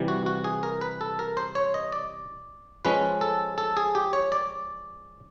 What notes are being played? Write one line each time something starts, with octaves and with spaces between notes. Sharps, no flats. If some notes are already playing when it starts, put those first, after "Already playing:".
Already playing: C3 E3 G3
F#4
F#4
G#4
A#4
B4
A4
A#4
C5
C#5
D#5
D5
F3 G#3 C#4 B4
A4
A4
G#4
G4
C#5
D5